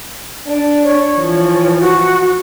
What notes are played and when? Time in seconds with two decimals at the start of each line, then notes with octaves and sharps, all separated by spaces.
0.47 D4
0.83 C#5
1.18 E3 F3
1.80 F#4